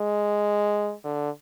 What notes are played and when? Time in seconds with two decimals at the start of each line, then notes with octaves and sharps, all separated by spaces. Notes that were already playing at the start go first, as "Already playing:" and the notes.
Already playing: G#3
1.05 D3